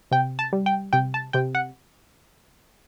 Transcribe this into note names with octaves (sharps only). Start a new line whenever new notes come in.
C3 G5
A5
G3
G5
C3 G5
A5
C3 G5
F#5